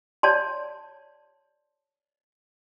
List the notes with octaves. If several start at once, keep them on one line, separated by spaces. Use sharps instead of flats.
C#5 D5 A5 C6